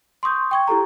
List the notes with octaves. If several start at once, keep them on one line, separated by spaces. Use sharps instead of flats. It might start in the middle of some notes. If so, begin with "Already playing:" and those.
C6 C#6 D#6 G6
G5 C#6 G#6
E4 G4 A4 A#5